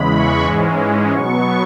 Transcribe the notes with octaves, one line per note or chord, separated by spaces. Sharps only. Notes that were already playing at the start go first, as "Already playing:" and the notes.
Already playing: E2 C#3 E3 G#3 B5
C#6
G#2 E3 G#3 C#4
B2 F#3 B3 C#6